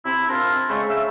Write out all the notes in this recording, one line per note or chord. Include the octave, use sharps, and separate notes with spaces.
C3 C4 E4
C4 D4 F4 A#4
C#3 G#3 A3
C#3 E5 E6